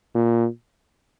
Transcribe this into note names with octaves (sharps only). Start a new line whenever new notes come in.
A#2